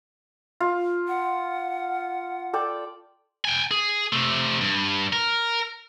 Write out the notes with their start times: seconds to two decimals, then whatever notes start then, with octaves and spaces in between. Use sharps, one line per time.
0.60 F4
1.08 F#5
2.53 A4 D5 G5
3.45 G5 G#5
3.71 G#4
4.13 C3 A3
4.61 G2
5.13 A#4